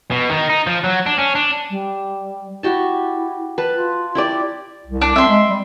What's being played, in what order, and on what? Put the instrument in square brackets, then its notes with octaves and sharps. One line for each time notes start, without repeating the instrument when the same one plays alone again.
[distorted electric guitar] B2
D#3
D#4
F3
F#3
D4
C#4
D4
[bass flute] G3
[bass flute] E4 [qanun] F#4 G4 A5
[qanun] B4 A5
[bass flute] F4
[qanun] E4 G4 D5
[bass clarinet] C2
[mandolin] D4
[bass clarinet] C4 [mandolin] E5 C6
[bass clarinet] G#3
G3